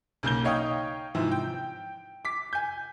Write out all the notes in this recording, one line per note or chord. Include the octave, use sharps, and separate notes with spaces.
B1 C#3 A#3 G6 G7
D#4 C#5 F5 G5 C#6 D#6
G#2 C3 E3 F3
G5
D6 B6
G#5 G6